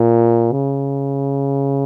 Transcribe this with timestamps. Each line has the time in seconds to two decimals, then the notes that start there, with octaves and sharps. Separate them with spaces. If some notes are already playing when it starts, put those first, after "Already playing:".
Already playing: A#2
0.52 C#3